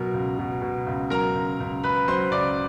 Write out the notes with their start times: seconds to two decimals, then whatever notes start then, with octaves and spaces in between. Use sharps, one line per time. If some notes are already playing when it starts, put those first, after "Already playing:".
Already playing: B2 F#3 A#4
0.14 C#2
0.39 B2
0.62 B2
0.87 C#2
1.10 F#3 A#4 A#5
1.35 C#2
1.60 C#2
1.84 C#2 B4 B5
2.08 F#3 C5 C6
2.31 C#2 D5 D6